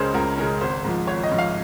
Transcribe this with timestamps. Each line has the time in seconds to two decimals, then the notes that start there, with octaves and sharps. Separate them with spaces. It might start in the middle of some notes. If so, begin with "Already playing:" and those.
Already playing: C#2 C#3 G#3 C#4 A#4 C5
0.14 C#2 A#4
0.37 C#3 G#3 C#4 A#4
0.61 G#1 C5
0.85 G#2 F3
1.07 G#1 C#5
1.23 D#5
1.31 G#2 F3
1.38 F5